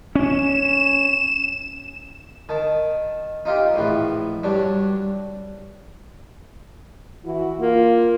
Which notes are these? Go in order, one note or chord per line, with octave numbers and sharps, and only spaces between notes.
C#4 E7
D#3 A5
D#4 F4 G4
A#1 A2 E3
G2 F#3 D4
E3 E4 F#4
A#3 F4